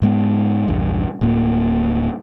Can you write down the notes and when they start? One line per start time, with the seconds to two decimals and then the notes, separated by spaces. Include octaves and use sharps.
0.02 G#2 G#3 B3
0.68 A#1 E2 G2
1.21 D1 A2 A#3